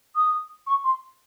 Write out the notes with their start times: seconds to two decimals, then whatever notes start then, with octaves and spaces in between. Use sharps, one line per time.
0.15 D#6
0.66 C#6
0.84 C6